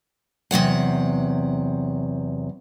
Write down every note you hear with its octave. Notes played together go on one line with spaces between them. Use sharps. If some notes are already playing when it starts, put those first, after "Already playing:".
E2 C3 F#3 F#5